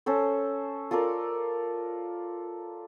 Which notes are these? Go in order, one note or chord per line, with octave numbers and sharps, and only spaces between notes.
C#4 A4 C5
F4 A4 A#4 D5